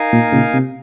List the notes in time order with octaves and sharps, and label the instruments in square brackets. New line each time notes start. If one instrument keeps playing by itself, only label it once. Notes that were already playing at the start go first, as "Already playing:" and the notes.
Already playing: [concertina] D#4 A#4 F5 G#5
[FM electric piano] A#2
A#2 C#3
C3